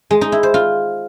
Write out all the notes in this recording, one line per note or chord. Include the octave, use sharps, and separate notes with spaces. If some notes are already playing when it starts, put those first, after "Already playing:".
G#3
D#4
E4
C5
F4